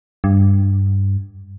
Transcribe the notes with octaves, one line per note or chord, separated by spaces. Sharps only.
G2